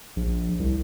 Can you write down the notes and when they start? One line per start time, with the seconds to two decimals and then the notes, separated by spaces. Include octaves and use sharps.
0.16 A#1
0.59 C2